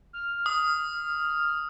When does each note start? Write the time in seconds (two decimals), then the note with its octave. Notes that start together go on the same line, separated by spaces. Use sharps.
0.13 F6
0.46 D#6